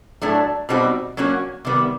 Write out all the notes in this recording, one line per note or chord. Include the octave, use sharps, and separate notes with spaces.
A2 F#3 A3 D4
B2 G3 C4 D#4 F#4
F#3 A#3 C#4 F#4
C3 D#3 G3 B3